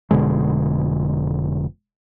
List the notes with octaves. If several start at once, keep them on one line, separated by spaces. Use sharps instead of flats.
F1 B2 D3 G#3